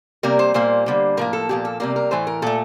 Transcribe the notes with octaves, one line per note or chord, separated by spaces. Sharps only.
C3 G3 A#3 A#4
C5
A#2 G3 A#3 C5
D3 G3 A#3
A2 F3 A#3 A#4
A4
A#2 F3 A#3 G4
A4
C3 G3 A#3 A#4
A#4
A2 E3 A3 C5
A#4
A#2 A3 A4